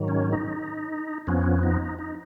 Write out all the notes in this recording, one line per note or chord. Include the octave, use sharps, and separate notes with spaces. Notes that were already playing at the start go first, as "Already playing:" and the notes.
Already playing: G#2 D#3 F#3
C#4
D#4
F2 F3 B3 C#4
D#4
D#4